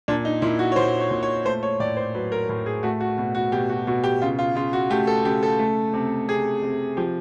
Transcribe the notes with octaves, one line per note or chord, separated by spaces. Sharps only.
A#2 D4
D#4
A#2 E4
F#4
C#5
A#2 C5
C#5
A#2
C#5
A3 C5
C#5
A2 D5
C5
F#3 B4
A#4
A2 A#4
G#4
A3 F#4
F#4
B2 F#4
F#4
B2 G4
F#4
B2 F#4
G4
C#3 F4
F4
C#3 F4
F#4
A3 G4
A4
C#3 G4
A4
A3
C3
C3 G#4
C3
F3 G4